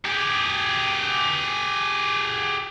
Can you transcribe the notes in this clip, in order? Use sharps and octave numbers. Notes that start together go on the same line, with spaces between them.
G4 G#4